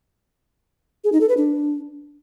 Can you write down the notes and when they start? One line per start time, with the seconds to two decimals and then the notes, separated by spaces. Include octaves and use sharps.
1.04 G#4
1.12 D#4
1.21 A4
1.29 B4
1.37 D4